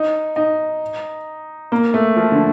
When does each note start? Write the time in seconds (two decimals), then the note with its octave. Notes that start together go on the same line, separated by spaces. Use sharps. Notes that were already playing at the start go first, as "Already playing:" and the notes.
Already playing: D#4
0.36 D#4
1.72 A#3
1.94 A3
2.16 F3
2.32 D3